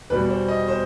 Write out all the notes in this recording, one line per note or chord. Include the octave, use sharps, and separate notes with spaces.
E2 B2 G3 B4
C5
D#5
C5